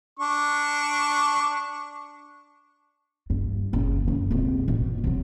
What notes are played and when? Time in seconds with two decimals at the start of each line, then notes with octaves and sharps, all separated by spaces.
0.19 D4 C#6
3.30 G2
3.73 F#1 C#3
4.05 F#1 G2
4.31 C#2 C3
4.68 G1 B2
5.04 C3 F#3